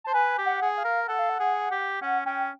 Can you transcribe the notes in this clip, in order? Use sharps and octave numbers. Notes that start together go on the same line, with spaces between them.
C5 A5
B4 G#5
G4
F#5
G#4
F5
A#4
A4 F#5
F5
F#5
G#4
G4
C#4 F#5
C#4 G5